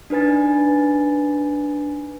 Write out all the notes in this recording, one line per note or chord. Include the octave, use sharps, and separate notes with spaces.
D4 D#4 B4 G#5 A6